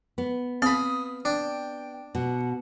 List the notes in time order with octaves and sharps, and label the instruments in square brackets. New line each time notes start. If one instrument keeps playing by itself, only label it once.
[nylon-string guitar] B3
[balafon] C4 [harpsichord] F5 B5 [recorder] D#6
[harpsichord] D4 [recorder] G5
[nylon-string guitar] B2 [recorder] F#5